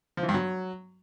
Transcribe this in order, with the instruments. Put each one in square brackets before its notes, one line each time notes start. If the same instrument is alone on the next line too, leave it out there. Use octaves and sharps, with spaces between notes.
[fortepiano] F3
E3
G2
F#3